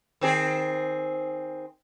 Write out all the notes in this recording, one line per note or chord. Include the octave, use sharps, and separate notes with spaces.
D#3 C4 G#4